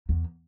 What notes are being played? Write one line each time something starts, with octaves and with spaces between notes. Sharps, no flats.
E2